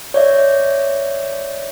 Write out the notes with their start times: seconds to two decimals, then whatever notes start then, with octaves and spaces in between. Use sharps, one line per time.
0.14 C#5 D5 E5